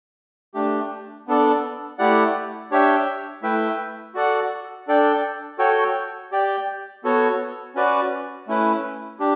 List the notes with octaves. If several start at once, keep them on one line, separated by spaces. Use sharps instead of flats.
A3 D4 G4
B3 D4 A4 D5
A3 E4 G4 D5 F#5
D4 G4 C#5 E5 G5
A3 E4 B4 E5 G5
F#4 A4 D5 F#5
D4 A4 D5 G5
F#4 A4 C#5 G5
G4 D5 G5
B3 F#4 A4 C#5
C#4 F#4 B4 D5
A3 C#4 E4 B4
D4 G4